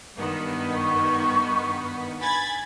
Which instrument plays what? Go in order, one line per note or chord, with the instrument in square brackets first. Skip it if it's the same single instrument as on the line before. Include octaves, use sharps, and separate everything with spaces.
[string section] G2 D#3 B3
[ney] C#6
[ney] G#5 [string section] B5 G#6 A6